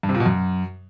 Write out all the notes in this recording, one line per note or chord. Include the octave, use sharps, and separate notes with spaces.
G2
C3
A#2
B2
F#2